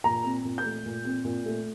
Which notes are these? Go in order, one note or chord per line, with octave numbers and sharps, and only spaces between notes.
A#2 A#5
C4
A#2
G6
A3
A#2
C4
A#2
A3